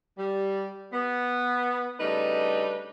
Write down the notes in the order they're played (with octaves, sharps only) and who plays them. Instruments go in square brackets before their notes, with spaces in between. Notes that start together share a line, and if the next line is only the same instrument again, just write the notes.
[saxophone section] G3
B3
C#3 G3 A3 D4 D#4 B4